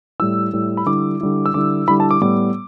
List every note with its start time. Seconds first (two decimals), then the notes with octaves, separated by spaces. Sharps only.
0.20 A2 G3 E4 E6
0.53 A2 G3 E4
0.77 B5
0.86 D3 G3 E4 D6
1.21 D3 G3 E4
1.46 E6
1.54 D3 G3 E4 D6
1.88 D3 G3 E4 B5
2.00 A5
2.11 D6
2.22 A2 G3 B3 D6